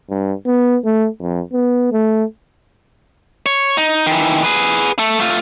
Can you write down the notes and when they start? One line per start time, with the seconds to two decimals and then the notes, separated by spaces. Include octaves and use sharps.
0.10 G2
0.46 B3
0.85 A3
1.21 F2
1.53 B3
1.92 A3
3.46 C#5
3.77 D#4
4.07 D#3 E3
4.43 G#4 B4
4.98 A3 A4
5.20 A3 F4